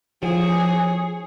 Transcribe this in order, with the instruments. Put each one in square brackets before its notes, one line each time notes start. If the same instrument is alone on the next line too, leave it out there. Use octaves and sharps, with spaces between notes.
[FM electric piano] F3 [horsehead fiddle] G#4 C#5